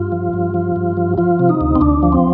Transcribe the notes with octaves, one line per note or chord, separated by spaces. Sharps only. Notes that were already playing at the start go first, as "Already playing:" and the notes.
Already playing: G2 F4
F3
G2
F3
G2
F3
F3 F4
C3
D#4
D2
C4
D2 D4
F3
C4